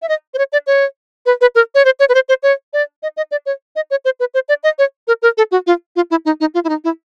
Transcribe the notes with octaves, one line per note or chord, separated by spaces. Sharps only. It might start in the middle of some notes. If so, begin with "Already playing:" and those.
E5
D#5
C5
C#5
D5
C#5
B4
B4
A#4
C#5
C5
C#5
B4
C5
C5
C#5
D5
D#5
D#5
D5
C#5
D#5
C#5
C5
B4
C5
D5
D#5
C#5
A#4
A#4
A4
F#4
F4
F4
E4
D#4
D#4
F4
E4
D#4
E4